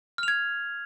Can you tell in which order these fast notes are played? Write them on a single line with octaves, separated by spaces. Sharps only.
F6 F7 G#6